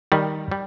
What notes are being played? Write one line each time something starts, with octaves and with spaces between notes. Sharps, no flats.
D#3 G3
G3